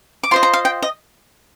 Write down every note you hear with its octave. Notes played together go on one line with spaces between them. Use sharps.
D6
F4 C5 D#5 C6
A#5
F5
G5
D#5